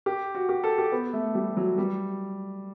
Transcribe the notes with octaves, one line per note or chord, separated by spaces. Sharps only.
G4
F#4
G4
A4
G4
B3
A3
G3
F#3
G3